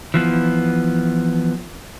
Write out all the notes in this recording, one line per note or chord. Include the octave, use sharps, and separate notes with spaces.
E3 F3 B3